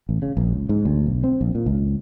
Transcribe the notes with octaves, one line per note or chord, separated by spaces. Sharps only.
A1
C#3
A#1
C#2
G#2
D2
B1
C4
A#1
A#2
C#2